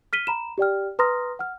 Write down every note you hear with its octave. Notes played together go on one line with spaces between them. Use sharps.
F6 B6 D#7 G7
A#5 B5 E7
G4 D5 G5 F6
B4 A#5 C6 D#6 F6 A#6
F#5 F6